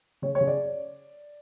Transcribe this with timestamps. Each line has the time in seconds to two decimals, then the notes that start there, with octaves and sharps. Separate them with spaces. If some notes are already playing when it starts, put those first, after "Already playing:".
0.22 C#3 C#5
0.35 C#5
0.41 C#3
0.47 D5